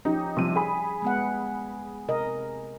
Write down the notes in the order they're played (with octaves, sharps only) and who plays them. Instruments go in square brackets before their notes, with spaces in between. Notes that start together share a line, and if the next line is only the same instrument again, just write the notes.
[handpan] F3 C#4 G4 [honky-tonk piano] D#4
[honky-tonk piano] C3 F3 D#7 [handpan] G3
[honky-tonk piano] G#4 B5
[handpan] G#3 B3 F#5
C3 A#4 D#5